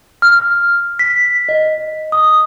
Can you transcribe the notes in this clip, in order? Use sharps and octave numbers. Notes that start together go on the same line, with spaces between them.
F6
B6
D#5
D#6